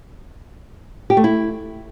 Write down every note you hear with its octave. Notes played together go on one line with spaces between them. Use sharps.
G4
A3
E4